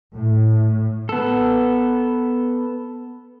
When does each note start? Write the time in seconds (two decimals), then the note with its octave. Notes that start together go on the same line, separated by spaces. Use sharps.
0.13 A2
1.09 B3 A4